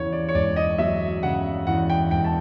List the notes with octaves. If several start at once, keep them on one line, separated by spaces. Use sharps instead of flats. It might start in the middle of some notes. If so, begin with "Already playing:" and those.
Already playing: E2 C#3 C#5
D5
C#5
E1 D5
D#5
F#3 E5
C#3 F#5
E2 F#5
G5
E1 G5
A5